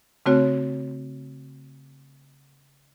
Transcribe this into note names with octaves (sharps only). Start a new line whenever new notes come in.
C#3 A3 C4 F#4 C#5